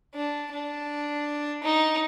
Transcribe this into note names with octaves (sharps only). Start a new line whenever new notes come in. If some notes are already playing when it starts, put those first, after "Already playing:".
D4
D4
D#4